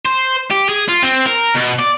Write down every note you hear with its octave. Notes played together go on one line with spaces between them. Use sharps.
C5
G4
G#4
F4
C4
A#4
B2
D5